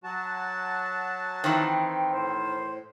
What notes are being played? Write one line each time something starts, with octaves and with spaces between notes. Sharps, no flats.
F#3 F#4 A5
D#3 E3 C4 G5
A2 C5